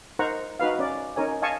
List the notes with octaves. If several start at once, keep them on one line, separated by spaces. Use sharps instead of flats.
D#4 A#4 C5 F#5 A#5 C#6
D#4 F#4 B4 F5
C#4 D5
C#4 D#4 A#4 C#5 G#5
D#5 F5 G#5 A5 C#6